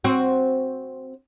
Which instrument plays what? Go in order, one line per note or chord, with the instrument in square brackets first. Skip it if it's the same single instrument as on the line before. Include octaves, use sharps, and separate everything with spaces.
[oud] C4 F#4